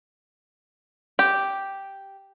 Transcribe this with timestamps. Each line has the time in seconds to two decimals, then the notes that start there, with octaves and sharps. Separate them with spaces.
1.19 G4